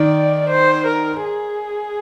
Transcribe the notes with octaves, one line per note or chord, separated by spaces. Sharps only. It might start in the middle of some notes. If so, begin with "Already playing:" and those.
Already playing: D#3 D5
C5
A#4
G#4